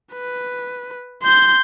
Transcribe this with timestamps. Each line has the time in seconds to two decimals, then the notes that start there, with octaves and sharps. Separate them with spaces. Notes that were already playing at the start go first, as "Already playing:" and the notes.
0.14 B4
1.23 C6 G6